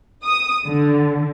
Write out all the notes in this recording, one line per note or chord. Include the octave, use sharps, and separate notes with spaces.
D#6
D3